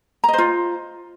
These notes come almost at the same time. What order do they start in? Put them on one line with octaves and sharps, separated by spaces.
A#5 D#5 C5 F4